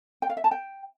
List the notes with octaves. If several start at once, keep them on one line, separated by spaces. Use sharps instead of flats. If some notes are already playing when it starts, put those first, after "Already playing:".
G5
F5
E5
A5
G5